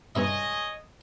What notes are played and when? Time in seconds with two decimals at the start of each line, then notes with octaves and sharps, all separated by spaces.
0.15 G2 C3 G#3 C#5 D#5 E5